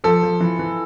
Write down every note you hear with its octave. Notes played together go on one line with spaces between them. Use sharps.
F3 A4
F3
E3
E3